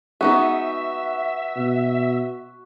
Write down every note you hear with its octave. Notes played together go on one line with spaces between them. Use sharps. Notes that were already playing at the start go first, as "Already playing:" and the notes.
B3 D#4 F#4 G#4 E5
B2